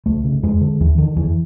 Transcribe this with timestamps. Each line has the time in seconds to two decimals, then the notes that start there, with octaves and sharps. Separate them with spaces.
0.06 C#2 A3
0.24 C#3
0.43 F2 G#3
0.61 D3
0.80 D#2 E3
0.98 D3 D#3
1.17 F2 E3